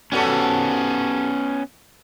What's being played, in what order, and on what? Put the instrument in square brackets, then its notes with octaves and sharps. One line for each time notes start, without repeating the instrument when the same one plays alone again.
[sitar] G3 F#4 A4 [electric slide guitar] B3 C#4